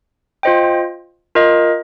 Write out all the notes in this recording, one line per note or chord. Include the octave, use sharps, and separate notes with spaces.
F4 C5 D#5 G5
F4 A#4 D#5